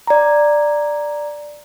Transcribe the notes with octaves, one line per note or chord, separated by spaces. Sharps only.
D5 A#5